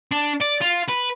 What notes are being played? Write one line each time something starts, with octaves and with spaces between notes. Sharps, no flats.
D4
D5
F4
B4